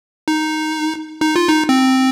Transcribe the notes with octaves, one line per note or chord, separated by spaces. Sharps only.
D#4
D#4
F4
D#4
C4